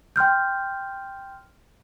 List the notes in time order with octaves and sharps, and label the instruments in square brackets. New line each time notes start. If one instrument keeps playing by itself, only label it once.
[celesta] G5 C6 F6 G6